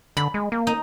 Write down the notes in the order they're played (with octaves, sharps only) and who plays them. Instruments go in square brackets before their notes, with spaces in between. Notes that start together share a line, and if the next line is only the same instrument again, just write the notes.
[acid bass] D3 [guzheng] B5
[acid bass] G#3
A#3
[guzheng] D#4